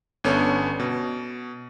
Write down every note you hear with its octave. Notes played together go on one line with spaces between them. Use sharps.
G1 B3 C#4 D4 A4 C#5
B2